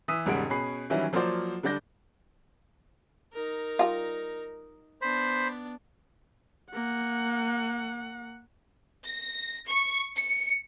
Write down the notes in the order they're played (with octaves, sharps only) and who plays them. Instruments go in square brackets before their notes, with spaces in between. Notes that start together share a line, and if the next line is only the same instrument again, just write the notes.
[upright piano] E3 D#6 E6 B6 D#7
E1 G#2 C#3 G3 F#5 D7
B2 C#4 G#4 B5 C7
D#3 E3 F#3 G3 C#4 E4
F3 F#3 A#3 F4 C5 D5
D3 G3 D4 D5 G6 A#6
[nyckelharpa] D#4 A#4
[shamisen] G3 F4
[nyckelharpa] B3 D4 [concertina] C5 B5
[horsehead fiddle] A#3 F#5
[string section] A#6
C#6
C#7